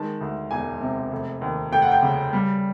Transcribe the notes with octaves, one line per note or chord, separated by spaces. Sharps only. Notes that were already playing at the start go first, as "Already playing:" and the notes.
Already playing: D#3 G#3 A5
D2
E1 G#5
C3
F1
D#2
F1 G5
F#5
G5
C#3
G3